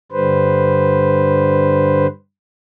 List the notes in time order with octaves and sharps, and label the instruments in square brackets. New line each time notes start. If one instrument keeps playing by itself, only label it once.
[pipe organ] G2 D3 G3 B4 C5